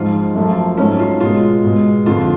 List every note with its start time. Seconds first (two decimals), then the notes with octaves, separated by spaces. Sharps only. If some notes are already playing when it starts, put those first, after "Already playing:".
Already playing: G#2 F3 G#3 F4
0.35 F#2 F3 A3
0.77 G#2 F#3 A3 C#4
0.99 F4
1.20 B2 G#3 F4
1.64 B2 G#3
2.06 F2 D3 F3 F4